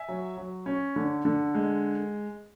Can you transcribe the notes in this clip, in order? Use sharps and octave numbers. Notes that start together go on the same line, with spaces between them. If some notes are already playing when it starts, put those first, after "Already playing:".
Already playing: E5 G#5
F#3
F#3
C#4
D3
D3
G#3